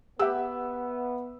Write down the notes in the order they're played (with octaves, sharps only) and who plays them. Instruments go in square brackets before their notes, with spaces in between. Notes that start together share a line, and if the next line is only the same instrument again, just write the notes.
[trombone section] B3 [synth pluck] G4 [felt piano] E5 F#5 E6